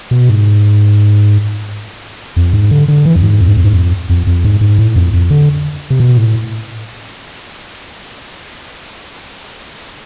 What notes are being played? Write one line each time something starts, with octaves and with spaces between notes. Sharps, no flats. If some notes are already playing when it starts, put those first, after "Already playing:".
B2
G#2
F2
G#2
D3
D3
E3
F2
G#2
F2
G#2
F2
G#2
F2
F2
F2
G#2
G#2
A2
F2
F2
D3
C3
B2
A2